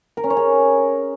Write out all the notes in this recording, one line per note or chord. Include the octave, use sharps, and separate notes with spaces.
A#4
C#4
C#5
G#4